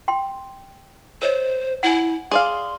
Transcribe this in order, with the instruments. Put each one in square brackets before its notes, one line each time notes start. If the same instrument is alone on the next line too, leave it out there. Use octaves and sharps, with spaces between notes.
[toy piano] G5 C6
[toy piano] A#4 C#5 D#5 [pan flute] C5
[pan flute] E4 [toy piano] F#5 G#5
[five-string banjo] G#4 D5 F5 [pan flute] C6